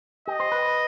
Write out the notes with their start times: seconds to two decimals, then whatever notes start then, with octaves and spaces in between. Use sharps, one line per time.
0.27 G4 D#5
0.40 C5
0.52 B4